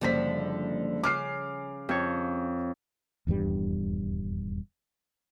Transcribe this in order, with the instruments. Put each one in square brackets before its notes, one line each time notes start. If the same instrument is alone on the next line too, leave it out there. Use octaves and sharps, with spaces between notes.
[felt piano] F#1 C5 B6 [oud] D3 F3 G3
[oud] C#3 C#4 [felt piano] D6 F6 C7
[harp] F2 C#5
[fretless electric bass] D#1 E2 G2 G3